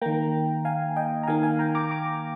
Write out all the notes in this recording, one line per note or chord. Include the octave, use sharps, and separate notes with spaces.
D#3 A#3 G5 A#5
F5 G#5
D#5 G5
A#5
D#3 A#3 F5 G#5
F5 G#5
G5 A#5
A#5 D6
A#5 D6